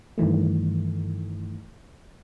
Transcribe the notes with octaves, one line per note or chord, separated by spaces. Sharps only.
G2 D#3 E3 A3